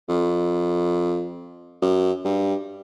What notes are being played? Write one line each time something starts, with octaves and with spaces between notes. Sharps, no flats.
F2
F#2
G2